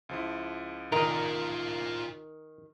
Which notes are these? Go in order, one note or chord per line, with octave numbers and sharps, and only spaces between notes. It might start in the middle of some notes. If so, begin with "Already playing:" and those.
C#2 F3 E4
D#3 F4 A#4 D5